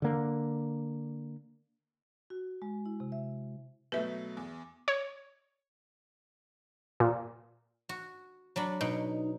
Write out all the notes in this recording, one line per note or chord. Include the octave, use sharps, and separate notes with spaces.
D3 A#3
F#4
G#3
E4
C3
E5
B2 F#3 A3 B4 E5
E2
C#5
A#2
F#4
F#3 D4 B5
B2 D#4